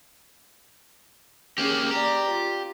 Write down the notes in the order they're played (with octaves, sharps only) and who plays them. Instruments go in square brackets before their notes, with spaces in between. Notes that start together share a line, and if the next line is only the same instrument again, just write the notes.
[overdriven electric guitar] A#3 G4 [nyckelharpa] C#4 G#4
[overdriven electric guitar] G4 [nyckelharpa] D5 A#5
[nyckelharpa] F4